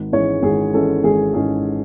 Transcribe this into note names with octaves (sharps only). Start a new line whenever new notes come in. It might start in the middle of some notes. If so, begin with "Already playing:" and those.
Already playing: G#1
G#2 E3 G#3 C#4 C#5
G#1 G#4
G#2 E3 G#3 C#4 A4
G#1 G#4
G#2 E3 G#3 C#4 G#4